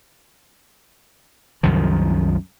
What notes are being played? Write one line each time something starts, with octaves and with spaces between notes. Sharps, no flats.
C2 F#2 D#3 F3